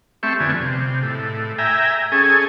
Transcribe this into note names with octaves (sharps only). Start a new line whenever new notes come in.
A3 C4 G4 E5 C#6
F2 D3 B3 G#5
C3
A2
E5 G5 G#5 A#5
C#4 G#4 A4 G#5